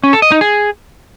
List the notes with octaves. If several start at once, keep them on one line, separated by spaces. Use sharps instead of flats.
C#4
A4
D#5
D#4
G#4